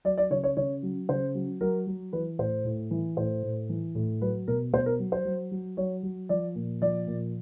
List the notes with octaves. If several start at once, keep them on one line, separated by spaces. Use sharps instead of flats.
F#3 D5
D5
C#3 C#5
C#5
C#3 C#5
F#3
C#3 C5
F#3
F#3 A#4
F#3
E3 B4
A2 C5
A2
E3
A2 C5
A2
E3
A2
F#3 B4
B2 A#4
B2 C5
A#4
F#3
C5
F#3
F#3
F#3 C#5
F#3
F3 D5
A#2
F3 D5
A#2